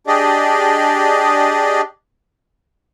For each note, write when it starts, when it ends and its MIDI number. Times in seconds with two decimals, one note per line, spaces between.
0.07 1.81 62
0.07 1.81 67
0.07 1.81 68
0.07 1.81 74
0.07 1.81 75